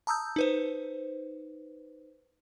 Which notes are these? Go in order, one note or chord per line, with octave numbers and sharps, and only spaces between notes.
A5 A#5 D#6 E6 G6
D#4 B4 C5